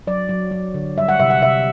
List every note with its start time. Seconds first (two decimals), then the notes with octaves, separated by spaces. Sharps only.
0.07 F#3 D5
0.29 F#3
0.51 F#3
0.74 D3
0.97 G3 E5
1.09 F#5
1.20 C3 E5
1.30 F#5
1.42 C3 E5